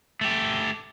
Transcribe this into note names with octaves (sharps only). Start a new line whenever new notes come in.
A3 G4